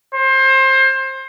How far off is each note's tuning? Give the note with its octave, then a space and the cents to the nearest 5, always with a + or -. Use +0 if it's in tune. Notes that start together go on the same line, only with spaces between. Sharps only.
C5 +25